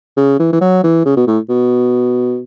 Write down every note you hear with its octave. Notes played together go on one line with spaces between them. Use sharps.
C#3
E3
E3
F#3
E3
C#3
B2
A2
B2